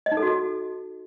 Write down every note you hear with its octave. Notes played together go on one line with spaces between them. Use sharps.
D#5
D#4
A4
F#4
A4